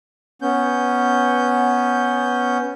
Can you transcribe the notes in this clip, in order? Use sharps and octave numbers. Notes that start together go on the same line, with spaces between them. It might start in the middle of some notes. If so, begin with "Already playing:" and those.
B3 C#4 G6